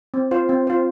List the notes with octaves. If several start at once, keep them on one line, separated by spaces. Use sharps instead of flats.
C4
F4 C5
C4
F4 C5